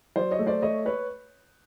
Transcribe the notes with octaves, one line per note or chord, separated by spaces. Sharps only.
F#3 C5 D5
C#5 D#5
A3
C5 D5
A3 C#5 D#5
B4 C#5